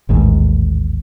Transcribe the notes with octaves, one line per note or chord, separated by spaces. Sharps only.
A1 D#2 G#2